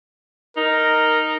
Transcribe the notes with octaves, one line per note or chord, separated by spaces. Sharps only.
D#4 A#4